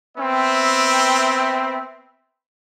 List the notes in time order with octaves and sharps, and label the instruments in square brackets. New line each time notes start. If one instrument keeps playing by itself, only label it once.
[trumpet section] B3 C4 E5 G5